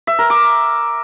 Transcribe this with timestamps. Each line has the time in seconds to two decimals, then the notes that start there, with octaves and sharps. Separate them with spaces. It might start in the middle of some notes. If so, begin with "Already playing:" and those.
0.07 E5
0.19 A#4
0.30 D6